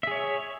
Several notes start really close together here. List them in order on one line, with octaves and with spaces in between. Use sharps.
E5 G#4 C#5